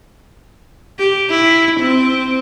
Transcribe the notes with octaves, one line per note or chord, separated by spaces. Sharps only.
G4
E4
C4